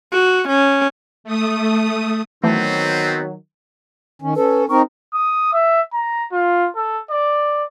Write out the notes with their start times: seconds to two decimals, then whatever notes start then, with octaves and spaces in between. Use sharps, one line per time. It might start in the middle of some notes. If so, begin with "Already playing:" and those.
0.13 F#4
0.48 C#4
1.24 A3 D#6
2.44 D#3 E3 F#3 A3 B3 C4
4.22 D#3 C#4
4.36 C#4 A4 B4
4.69 C4 D#4 A#4 C#6
5.14 D#6
5.53 E5
5.93 A#5
6.32 F4
6.76 A4
7.11 D5